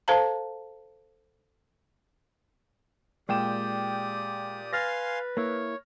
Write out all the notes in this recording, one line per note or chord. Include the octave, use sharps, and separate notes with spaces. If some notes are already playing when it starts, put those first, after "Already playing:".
A4 C5 F5 A5 A#5
A#2 G#3 G4 D5 G5 D#6 E7
B4 F5 G#5 C6 F6 A6 A#6
A#3 E4 C#5